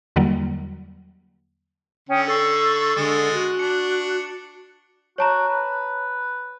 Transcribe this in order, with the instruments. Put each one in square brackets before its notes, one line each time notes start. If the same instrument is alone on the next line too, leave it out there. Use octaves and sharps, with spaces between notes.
[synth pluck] E2 D3 F#3 G3 A#3
[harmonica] D3 [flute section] C#4 G5 D#6
[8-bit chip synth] A4 A6 C7 [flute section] C#6 E6
[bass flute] D3 [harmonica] G#3
[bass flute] F#4 [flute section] F#6
[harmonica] D4 [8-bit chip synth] C#7
[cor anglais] F#4 [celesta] C#5 A5 A#5
[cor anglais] B4